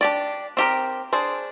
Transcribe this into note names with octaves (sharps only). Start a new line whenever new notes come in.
D4 G4 D5
C4 G4 A#4
D4 G#4 C5